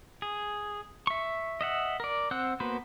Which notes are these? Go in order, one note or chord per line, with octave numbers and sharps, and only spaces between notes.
G#4
E5 C#6
D#5 E5 F#5
A#4 D5
C4 C5 F#5 E6 F#6
A#3 B3 F#4 B4 C5